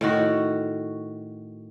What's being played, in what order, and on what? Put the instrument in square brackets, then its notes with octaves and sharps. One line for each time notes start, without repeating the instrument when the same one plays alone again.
[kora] A2 D#3 F#4